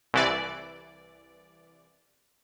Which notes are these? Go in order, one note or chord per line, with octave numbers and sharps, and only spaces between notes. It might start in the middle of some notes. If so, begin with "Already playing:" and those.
C2 E3 D5